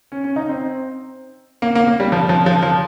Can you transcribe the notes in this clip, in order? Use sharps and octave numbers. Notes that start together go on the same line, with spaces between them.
C#4
C#4
D#4
C4
A#3
A#3
A#3
G3
F3
F3
F3
F3